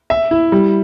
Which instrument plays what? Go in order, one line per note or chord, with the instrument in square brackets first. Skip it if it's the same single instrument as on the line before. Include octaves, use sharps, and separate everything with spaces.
[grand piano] E5
E4
G3